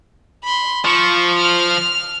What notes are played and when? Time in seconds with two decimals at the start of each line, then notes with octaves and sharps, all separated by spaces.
0.44 B5 C6
0.85 F3 C#6
1.39 F6 F7